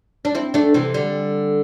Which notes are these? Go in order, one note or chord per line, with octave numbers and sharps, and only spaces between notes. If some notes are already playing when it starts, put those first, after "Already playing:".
D4
C4 E4
A3 D4
C3 E3
D3 G3